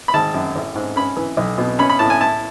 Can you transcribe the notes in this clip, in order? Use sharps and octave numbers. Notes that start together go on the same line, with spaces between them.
B5
G#1 A5
F#2
A1
G#2
C#4 B5
E3
B1
B2
C#4 B5
B5
A2 A5
G#5
E4 A5